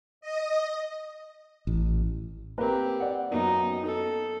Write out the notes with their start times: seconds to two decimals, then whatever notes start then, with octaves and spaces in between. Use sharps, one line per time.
0.21 D#5
1.67 A1
2.58 A#3 C4 G4 A#4 B4
3.00 D5 F#5
3.31 F#2 A#3 B3 D#4
3.85 A4